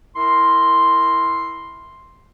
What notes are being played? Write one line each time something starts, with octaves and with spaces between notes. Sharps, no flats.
E4 A#4 C6